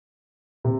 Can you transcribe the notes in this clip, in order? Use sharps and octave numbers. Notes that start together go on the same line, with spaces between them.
C3